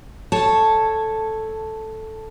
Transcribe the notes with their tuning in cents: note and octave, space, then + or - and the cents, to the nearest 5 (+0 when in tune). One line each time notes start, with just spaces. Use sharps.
A4 +0 C#5 -5 A5 +0